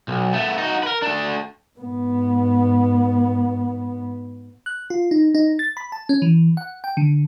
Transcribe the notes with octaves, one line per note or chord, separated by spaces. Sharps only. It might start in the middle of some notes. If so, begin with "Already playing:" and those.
B1
A3 B3
D#4 F#4
A#4 B4
A3 D4
G#2 B3
F#6
F4
D#4
D#4
A6
B5
A5
C#4
E3
F#5
G5
D3